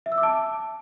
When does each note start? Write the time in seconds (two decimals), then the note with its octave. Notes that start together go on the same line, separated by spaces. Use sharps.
0.06 E5
0.12 E6
0.17 D6
0.23 A5